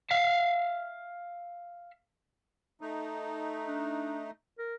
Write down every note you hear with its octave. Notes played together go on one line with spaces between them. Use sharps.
E5 F5
A3 D#4
D4
A#4